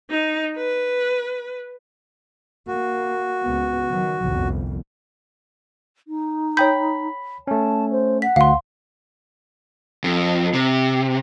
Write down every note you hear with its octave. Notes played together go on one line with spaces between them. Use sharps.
D#4
B4
A#3 F#4
C#2 B3
D#3 F#3
G1 C2 F2
D#4
C#5 G5 B5 G6
A3 C#4 A5
C5
F#5 B6
D2 F5 C6
F2
C3